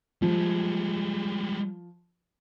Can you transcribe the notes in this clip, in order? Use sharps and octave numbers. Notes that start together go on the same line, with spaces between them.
F3 G3 G#3